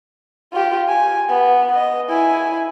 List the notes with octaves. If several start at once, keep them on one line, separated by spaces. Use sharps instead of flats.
F4 G4
G#5
B3
D#5
E4 G#5